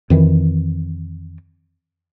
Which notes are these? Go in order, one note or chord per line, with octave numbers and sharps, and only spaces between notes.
F2 D#3 E3